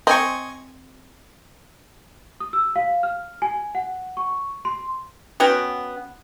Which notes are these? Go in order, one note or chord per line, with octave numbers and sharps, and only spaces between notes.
C4 D#5 G#5 C#6
D#6
E6
F5
F6
G#5
F#5
C#6
C6
B3 C#4 F#4 G5